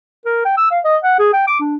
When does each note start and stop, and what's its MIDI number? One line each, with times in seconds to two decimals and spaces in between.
0.26 0.44 70
0.45 0.55 79
0.57 0.68 88
0.71 0.79 77
0.85 0.97 75
1.03 1.18 78
1.19 1.29 68
1.33 1.44 79
1.47 1.58 86
1.60 1.76 62